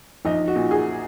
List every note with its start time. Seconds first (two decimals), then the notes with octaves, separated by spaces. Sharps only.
0.25 A#1 D#4
0.48 F#4
0.56 A#2
0.71 G#4